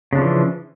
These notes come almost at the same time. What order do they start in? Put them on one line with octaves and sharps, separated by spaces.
C#3 D4 F3 E3